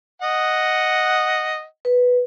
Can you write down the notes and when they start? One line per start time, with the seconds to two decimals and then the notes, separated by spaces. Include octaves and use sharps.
0.22 D#5 F#5
1.85 B4